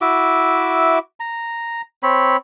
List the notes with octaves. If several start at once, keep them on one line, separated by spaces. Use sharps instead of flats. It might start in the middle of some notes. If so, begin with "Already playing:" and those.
E4 F#4 E5 D6
A#5
C4 C#5 B5